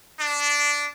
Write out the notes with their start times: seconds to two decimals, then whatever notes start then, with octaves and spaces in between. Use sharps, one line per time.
0.18 D4